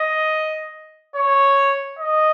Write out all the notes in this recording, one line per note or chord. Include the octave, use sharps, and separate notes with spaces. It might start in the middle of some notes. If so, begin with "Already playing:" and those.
Already playing: D#5
C#5
D#5